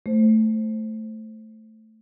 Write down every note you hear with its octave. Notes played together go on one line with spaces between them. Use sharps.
A3 C5